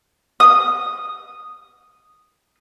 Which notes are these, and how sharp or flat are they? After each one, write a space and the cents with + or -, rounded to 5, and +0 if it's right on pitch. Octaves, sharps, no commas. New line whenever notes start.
D#6 -5